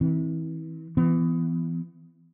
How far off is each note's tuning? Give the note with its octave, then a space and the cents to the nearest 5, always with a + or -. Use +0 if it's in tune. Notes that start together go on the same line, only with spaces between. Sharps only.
E3 -35 C4 +0
E3 +25 B3 +25